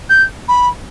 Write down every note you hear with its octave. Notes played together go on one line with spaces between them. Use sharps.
G6
B5